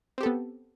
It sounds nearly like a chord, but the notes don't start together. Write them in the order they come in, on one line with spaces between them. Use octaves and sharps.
C4 G4 A4 B3